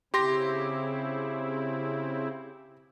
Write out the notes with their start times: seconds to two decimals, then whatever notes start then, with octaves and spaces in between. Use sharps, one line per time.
0.14 C#3 C4 E4 G4 C6 A#6